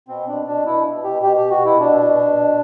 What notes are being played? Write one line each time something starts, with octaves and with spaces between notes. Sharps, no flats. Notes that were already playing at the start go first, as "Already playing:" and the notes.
B2 C4
B2 D4
B2 D4
B2 E4
B2
B2 G4
B2 G4
B2 G4
F#4
B2 E4
B2 D4
B2
B2
B2